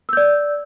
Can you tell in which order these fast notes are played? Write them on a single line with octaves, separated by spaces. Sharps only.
E6 G6 D5